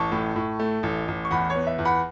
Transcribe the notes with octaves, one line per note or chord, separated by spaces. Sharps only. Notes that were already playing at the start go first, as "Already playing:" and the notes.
Already playing: A1 A5 C#6
A2
A2
A3
A1
A1
C#6
E2 F#5 B5
C#5
B3
E5
E2
F#5 B5